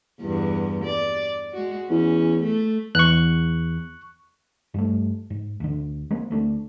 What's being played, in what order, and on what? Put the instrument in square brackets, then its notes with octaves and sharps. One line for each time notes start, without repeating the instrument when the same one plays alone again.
[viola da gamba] E2 G2
D5
G#3 F#4
[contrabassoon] E2 [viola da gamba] C#4
[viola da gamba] A3
[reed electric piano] E2 [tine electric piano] C#6 F#6
[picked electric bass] G2 G3 A3
G#2
D2 D3
G#3 A#3 C4
D2 A3 D4